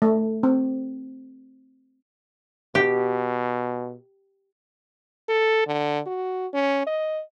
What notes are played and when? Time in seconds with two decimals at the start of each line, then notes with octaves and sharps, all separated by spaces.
0.02 A3
0.43 C4
2.75 B2 G4
5.29 A4
5.67 D3
6.07 F#4
6.54 C#4
6.87 D#5